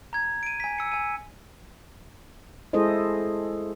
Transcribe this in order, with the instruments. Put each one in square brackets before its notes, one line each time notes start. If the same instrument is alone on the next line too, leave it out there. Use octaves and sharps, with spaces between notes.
[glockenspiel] A#5 G#6
D7 D#7
G#5 B6
E6 C#7
G#5 D#7
[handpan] G#3 E4 G#4 A4 C5 D#5